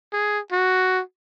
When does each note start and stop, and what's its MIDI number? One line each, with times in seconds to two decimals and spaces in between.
0.13 0.40 68
0.52 1.01 66